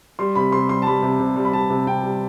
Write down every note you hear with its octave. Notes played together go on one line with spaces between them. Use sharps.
G3 C6
C3 B5
C3 C6
G3 C6
A5
G3 B5
C3
C3
G3
B5
G3 A5
C3
C3 G5
G3